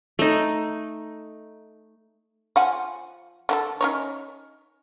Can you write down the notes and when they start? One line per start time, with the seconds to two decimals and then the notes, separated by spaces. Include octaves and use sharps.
0.19 A3 D#4
2.56 F3 F#5 G#5
3.49 D3 F#4 A4
3.81 C#4 D#4 C#5